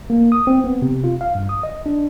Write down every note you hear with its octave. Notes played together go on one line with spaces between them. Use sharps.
A#3
D#6
C4
B3
C3
F4
F5
G2
D#6
D#5
D4